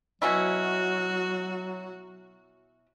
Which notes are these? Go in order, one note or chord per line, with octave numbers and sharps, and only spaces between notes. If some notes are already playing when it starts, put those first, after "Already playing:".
B2 F#3 C#4 E4 F#4